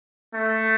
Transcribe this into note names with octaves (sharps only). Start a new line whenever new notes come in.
A3